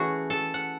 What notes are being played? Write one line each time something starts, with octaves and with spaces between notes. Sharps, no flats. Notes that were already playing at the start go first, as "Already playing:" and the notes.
Already playing: E3 A3 C#4 F#4 G#4
A4
F#5